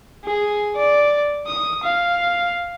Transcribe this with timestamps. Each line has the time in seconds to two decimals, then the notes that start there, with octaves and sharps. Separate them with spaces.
0.25 G#4
0.76 D5
1.47 D#6
1.84 F5